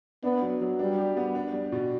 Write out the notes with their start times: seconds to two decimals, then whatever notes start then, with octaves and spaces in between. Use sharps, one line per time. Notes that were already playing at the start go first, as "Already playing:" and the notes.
0.23 B3 D4
0.42 F#3
0.61 F#3
0.79 G3 D4
0.98 G4
1.17 B3
1.35 D4
1.53 G3
1.72 B2